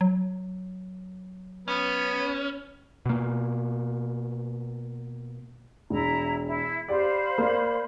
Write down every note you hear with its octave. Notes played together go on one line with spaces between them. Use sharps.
F#3
B3 C#4
B2 A#3
E1 E4 A#5
E4
G4 C5 D5 F5 B5
A#3 D5